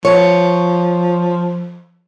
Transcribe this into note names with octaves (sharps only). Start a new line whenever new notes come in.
F3 C#5